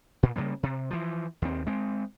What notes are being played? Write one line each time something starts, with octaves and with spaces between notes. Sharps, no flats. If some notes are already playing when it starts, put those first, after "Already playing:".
A#2
C#3 E3 G3 A#3
C3
E3 F3
D#2 C4
G#3 C4